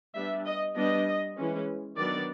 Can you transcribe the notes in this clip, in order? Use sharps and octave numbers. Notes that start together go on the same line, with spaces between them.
G3 B3 D4 E5
D#5
G3 B3 D4 D#5
E3 G#3 C#4
D#3 F#3 B3 D4 D5